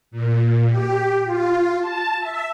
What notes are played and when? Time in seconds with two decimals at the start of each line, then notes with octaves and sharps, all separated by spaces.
0.11 A#2
0.68 G4
1.25 F4
1.80 A5
2.20 E5